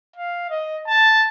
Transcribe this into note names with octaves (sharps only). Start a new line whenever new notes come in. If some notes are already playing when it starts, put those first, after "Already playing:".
F5
D#5
A5